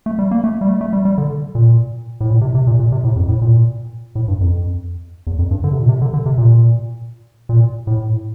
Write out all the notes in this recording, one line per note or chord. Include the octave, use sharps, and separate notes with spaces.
A3
G3
A#3
A3
G3
A3
A3
G3
G3
D3
A#2
A2
A#2
C3
C3
A#2
A#2
C3
A2
F2
A2
A#2
A2
G2
F2
E2
F2
G2
D3
C3
A#2
C3
D3
D3
C3
A#2
A#2
A2